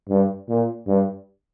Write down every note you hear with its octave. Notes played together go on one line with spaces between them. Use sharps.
G2
A#2
G2